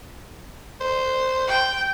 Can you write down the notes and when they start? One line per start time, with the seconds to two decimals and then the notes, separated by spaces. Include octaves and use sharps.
0.80 C5
1.48 G5